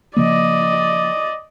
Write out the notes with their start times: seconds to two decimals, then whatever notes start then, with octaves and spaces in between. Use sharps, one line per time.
0.16 C#3 F3 A#3 D5 D#5